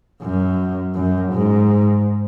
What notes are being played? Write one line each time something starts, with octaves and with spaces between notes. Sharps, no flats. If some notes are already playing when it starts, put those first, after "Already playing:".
F#2
F#2
G#2